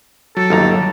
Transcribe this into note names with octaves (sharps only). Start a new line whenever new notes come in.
F#3 A4
G1 D#2 A#5